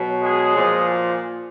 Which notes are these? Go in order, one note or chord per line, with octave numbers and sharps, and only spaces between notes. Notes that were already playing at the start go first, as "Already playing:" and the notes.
Already playing: B2 F#3
G#3 G#4
A#2 F3